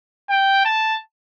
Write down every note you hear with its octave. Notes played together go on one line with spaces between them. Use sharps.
G5
A5